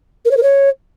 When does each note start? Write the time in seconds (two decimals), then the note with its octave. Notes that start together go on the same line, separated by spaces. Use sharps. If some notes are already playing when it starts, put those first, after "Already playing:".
0.25 A#4
0.31 C#5
0.37 A#4
0.42 C#5